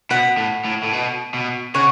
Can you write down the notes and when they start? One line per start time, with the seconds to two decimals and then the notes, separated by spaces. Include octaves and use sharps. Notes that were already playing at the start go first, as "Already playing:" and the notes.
0.10 B2 F#5 B5
0.38 A2
0.65 A2
0.83 A2
0.93 B2
1.34 B2
1.75 C#3 C#5 F#5